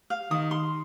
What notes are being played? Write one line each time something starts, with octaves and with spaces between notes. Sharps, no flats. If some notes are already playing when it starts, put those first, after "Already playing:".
F5
D#3 D#6
C6